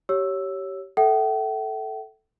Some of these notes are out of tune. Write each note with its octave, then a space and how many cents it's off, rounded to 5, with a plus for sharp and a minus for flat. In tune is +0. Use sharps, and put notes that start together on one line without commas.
G4 -20 C#5 +0 E6 +0
A4 +0 E5 +15 G5 -45